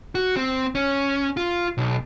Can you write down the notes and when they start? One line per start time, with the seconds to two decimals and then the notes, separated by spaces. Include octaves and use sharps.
0.15 F#4
0.36 C4
0.75 C#4
1.37 F4
1.78 B1